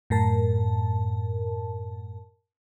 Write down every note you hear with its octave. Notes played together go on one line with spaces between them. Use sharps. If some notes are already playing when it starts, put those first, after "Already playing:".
F#2 A2 A#4 A5